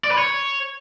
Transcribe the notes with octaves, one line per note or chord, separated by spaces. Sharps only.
D5
B4
C#5